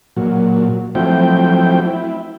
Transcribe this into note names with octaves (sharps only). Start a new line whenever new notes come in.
A#2 F#3
F3 F#3 A3 C4 E4 G5
E4